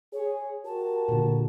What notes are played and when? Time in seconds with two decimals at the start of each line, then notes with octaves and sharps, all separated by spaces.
0.13 G#4 C#5
0.65 F#4 G4 A#4 A5
1.09 A#2 D3